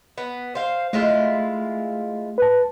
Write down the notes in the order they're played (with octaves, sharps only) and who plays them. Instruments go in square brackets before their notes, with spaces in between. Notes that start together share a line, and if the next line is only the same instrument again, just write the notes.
[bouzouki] B3
C5 F5
[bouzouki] G#3 E4 F4 [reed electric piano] A3
[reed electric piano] B4 A5